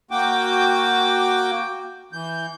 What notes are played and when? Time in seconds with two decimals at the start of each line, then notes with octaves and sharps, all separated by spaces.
0.11 A#3 F#4 G5 D6
2.13 E3 G6